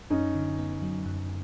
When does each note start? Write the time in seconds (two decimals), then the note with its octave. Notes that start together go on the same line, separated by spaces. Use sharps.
0.10 F#2 C#4 D#4
0.35 D3
0.58 B3
0.82 F#3
1.06 F#2